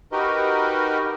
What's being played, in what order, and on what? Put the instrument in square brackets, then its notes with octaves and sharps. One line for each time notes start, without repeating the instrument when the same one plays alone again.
[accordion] D#4 F#4 G4 A#4 B4 D#5